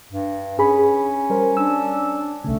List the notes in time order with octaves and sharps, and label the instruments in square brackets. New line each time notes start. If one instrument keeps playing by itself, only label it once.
[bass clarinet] G2
[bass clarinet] C#4 [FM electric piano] G#4 B5
[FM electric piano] G3 A#4 C5
[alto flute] D4 [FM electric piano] E6
[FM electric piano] C2 C#3 [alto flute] A3